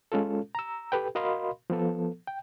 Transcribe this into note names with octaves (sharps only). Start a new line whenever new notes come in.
G#3 C#4 F4 A4
A#5 E6
G4 A4 B4 G5
F#4 A#4 D#5 F5 B5 C6
F3 B3 A4
G5